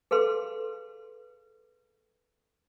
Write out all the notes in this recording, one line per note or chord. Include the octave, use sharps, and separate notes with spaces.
G#4 A4 B4 F5 C6